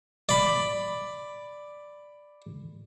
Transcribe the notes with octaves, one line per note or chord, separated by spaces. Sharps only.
D5 B5